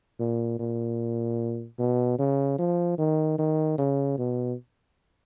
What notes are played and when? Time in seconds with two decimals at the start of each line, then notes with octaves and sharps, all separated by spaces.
0.20 A#2
0.59 A#2
1.79 B2
2.19 C#3
2.59 F3
2.98 D#3
3.38 D#3
3.78 C#3
4.18 B2